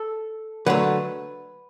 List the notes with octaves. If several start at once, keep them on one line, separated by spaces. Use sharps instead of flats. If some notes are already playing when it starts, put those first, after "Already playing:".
Already playing: A4
D3 F#3 A3 B4